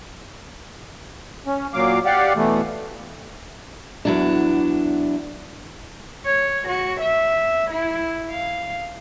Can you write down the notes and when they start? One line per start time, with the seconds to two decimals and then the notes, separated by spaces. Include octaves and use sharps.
1.46 C#4
1.74 A#2 F#3 F5 D6
2.05 G4 D5 F5 F#5
2.36 B2 E3 A3
4.05 E2 F#3 D4
6.25 C#5
6.67 F#4
7.00 E5
7.70 E4
8.31 F5